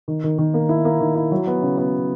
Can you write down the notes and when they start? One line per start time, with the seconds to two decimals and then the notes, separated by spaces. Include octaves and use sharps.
0.08 D#3
0.24 D#3
0.38 D#3
0.54 A#3
0.69 E4
0.85 A#3
1.00 D#3
1.15 E4
1.31 F#3
1.47 B3
1.63 C#3
1.78 B3